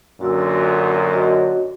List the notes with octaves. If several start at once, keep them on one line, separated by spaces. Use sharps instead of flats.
F#2 A#2 D3 F#4 E6
F#4 C#5 D#5